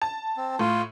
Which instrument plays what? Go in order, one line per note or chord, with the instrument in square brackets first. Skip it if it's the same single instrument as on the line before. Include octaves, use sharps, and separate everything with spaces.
[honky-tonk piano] A5
[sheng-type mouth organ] C4
[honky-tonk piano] A2 [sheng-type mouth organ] F4